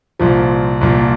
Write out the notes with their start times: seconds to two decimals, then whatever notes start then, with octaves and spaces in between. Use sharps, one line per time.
0.19 C2 A#2 F3
0.81 C2 A#2 F3